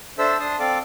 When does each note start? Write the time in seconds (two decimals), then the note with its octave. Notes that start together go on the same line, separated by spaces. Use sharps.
0.19 D4 A4 C5 E5 E6
0.40 D4 A5 C6 D#6
0.60 C4 A4 D5 F5 D6